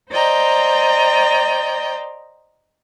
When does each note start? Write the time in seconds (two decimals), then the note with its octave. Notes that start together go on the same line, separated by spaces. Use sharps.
0.11 C5 D5 D#5 G5 A#5